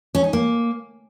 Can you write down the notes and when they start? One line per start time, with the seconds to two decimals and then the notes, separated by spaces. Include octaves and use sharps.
0.15 C#4
0.24 D#4
0.33 A#3